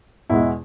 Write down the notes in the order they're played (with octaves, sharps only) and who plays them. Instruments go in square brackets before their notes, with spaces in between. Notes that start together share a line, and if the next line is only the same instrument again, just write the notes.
[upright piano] E2 B2 G#3 E4